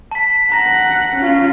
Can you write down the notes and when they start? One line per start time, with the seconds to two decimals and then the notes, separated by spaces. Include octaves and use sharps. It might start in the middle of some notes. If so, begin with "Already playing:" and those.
0.11 A5 B6
0.52 F#5 A#5 A#6
1.17 C#4 F4